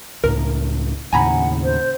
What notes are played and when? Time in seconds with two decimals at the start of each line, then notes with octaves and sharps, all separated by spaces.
0.24 C#2 A2 A#4
1.13 D#2 A2 C#3 F#5 G#5 A#5 B5
1.64 C5